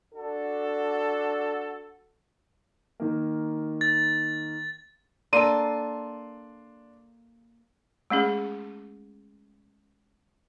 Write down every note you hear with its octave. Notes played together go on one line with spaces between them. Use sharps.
D4 F#4 A4
D#3 A#3
A6
A#3 D4 A4 C6 D#7
G#3 A3 C#4 G#4